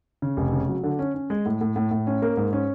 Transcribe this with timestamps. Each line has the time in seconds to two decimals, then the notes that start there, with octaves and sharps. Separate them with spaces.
0.22 C#3
0.37 F1
0.53 C#3
0.69 F#3
0.83 D3
0.99 C#4
1.14 C#4
1.30 G#3
1.46 A2
1.61 A2
1.76 A2
1.91 A2
2.07 C#4
2.22 A#3
2.37 G#2
2.53 C#4